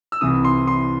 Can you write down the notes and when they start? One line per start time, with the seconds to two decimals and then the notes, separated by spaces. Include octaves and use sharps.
0.12 E6
0.21 C2 C3 E3 D#6
0.44 C6
0.67 C6